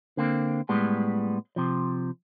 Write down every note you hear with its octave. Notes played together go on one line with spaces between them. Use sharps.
D3 A#3 C4
A2 G3 G#3 B3
C3 F3